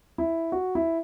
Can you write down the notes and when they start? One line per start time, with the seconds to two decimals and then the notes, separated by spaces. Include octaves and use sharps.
0.18 E4
0.52 F#4
0.75 E4